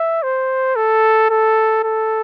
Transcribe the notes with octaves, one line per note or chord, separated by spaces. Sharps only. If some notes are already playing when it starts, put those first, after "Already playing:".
Already playing: E5
C5
A4
A4
A4